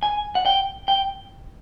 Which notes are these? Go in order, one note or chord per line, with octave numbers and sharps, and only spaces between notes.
G#5
F#5
G5
G5